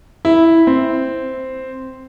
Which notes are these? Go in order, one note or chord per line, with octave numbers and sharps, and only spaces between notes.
E4
C4